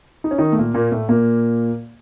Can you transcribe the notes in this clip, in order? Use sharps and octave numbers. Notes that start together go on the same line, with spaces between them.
D#4
C#4
D#3 D#4
A3
A#2 A#3
A#2 A#3
A2 A3
A#2 A#3